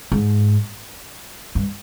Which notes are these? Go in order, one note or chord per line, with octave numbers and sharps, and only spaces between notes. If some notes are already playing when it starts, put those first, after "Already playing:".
G#2
G2